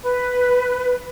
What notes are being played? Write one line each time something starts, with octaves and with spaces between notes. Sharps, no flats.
B4